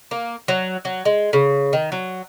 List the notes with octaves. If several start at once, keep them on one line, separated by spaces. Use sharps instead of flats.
A#3
F#3
F#3
G#3
C#3
D#3
F#3